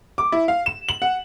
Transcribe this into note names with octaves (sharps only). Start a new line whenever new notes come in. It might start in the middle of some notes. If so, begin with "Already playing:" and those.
D6
E4
F5
E7
F#7
F#5